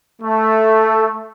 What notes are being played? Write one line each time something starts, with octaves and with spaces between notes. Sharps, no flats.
A3